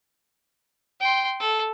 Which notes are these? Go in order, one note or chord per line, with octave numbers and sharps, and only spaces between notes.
G5 C6
A4